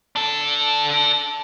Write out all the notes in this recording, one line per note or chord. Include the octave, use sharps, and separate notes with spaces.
D4 A4